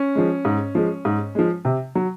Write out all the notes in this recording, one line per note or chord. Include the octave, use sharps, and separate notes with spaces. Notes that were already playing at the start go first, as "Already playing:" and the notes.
Already playing: C#4
F3 G#3
G#2
F3 G#3
G#2
F3 G#3
C3
F#3